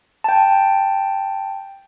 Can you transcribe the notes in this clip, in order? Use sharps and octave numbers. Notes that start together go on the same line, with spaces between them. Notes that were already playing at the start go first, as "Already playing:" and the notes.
G5 A5